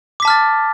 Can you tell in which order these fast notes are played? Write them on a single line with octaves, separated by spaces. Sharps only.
D6 B6 A5 F6 A6